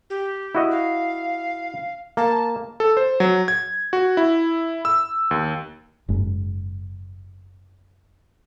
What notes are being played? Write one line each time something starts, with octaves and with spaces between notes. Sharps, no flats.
G4
E4 F#4 D#5
F5
A#3 A5
A4
C5
F#3
G#6
F#4
E4
E6
D#2
F#1 G#2